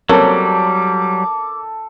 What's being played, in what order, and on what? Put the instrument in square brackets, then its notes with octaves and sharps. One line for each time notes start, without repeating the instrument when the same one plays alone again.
[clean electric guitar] F#3 G3 [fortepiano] A#3 C4 C#4 [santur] A4 [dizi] D6